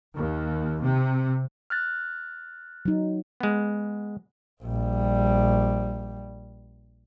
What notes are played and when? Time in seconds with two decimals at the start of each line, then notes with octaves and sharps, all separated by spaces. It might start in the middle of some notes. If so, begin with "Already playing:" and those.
0.15 D#2
0.81 C3
1.70 F6 F#6 A6
2.85 F#3 D#4
3.40 G#3 B3
4.63 A#1 G3